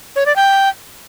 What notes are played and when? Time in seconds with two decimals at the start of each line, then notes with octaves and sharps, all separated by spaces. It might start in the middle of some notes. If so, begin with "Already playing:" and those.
0.16 C#5
0.26 D5
0.36 G5